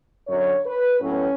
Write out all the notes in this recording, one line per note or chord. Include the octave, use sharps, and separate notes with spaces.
F#2 D3 F#3 C#5
B4
A2 F#3 B3 C#4